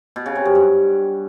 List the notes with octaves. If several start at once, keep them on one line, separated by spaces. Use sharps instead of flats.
B2
C#3
C3
F#2
G2